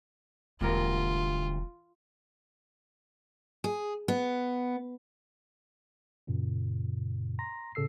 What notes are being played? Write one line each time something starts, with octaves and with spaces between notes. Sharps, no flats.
E1 D2 G2 F4 A#4
G#4
B3
F#2 A#2 C#3
A#5 C6 A#6
A2 C#3 A4 E6 C7